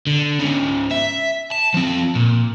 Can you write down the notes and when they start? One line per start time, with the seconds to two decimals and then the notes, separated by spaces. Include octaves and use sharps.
0.07 D3
0.39 G#2 C#3
0.91 E5
1.51 A5
1.74 F3 C4
2.15 A#2